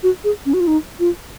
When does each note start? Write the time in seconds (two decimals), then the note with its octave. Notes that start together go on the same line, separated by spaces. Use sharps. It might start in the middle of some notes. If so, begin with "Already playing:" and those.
0.03 F#4
0.24 G#4
0.46 C#4
0.54 F#4
0.60 F4
0.67 D#4
1.00 F4